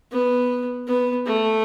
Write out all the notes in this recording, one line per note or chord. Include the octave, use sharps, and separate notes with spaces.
B3
B3
A3